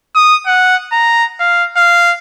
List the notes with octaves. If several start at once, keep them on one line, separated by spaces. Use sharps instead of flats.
D#6
F#5
A#5
F5
F5